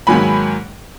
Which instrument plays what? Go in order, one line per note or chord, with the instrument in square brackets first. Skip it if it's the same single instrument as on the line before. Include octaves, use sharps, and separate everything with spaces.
[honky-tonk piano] G#2 D#3 F#3 A#3 G#5 B5